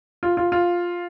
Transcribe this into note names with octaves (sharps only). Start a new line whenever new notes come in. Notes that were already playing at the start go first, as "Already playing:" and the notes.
F4
F4
F4